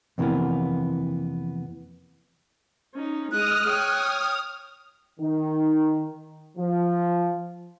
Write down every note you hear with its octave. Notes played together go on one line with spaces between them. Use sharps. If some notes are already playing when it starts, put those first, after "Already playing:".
F2 C3 E3 G3 A#3 B3
C#4 D#4
G#3 D#5 D#6 F6 F#6
C#5 G5
D#3
F3